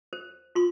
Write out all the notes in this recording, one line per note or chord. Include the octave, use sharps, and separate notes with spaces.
C5
F4 C6